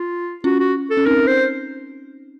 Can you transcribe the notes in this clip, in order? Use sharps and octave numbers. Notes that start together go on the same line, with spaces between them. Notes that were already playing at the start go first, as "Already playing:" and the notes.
Already playing: F4
C#4 F4 F#4
F#4
A4
C#4
C4 D#4 A#4
C5